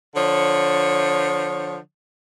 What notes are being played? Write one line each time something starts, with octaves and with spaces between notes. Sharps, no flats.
D3 F3 C#5